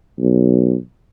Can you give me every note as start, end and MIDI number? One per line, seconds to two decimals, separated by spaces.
0.20 0.75 35